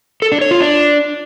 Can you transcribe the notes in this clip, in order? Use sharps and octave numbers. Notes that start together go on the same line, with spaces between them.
A4
D4
C#5
F4
D4